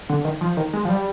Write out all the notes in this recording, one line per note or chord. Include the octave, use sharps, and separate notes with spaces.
D3
D#3
F3
D#3
G#3
F3
G3